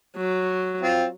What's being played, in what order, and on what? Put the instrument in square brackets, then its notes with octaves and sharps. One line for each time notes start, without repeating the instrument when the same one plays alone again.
[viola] F#3
[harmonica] C4 F4